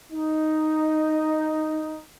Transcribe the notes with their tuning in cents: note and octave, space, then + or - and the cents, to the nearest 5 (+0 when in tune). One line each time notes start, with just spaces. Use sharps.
D#4 +0